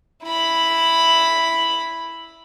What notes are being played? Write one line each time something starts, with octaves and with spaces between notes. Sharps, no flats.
E4 B5